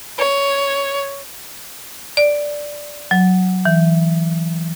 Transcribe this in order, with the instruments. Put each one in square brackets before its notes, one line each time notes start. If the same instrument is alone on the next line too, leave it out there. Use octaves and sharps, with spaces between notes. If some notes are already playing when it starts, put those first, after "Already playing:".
[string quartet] C#5
[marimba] D5
F#3
E3